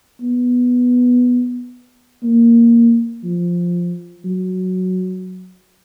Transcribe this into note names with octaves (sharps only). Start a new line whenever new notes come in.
B3
A#3
F3
F#3